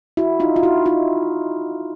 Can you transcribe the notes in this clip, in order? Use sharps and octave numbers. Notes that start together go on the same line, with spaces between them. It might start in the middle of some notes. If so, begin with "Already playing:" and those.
E4 F#4
D#4 F4
F4
E4 F#4
D#4 F4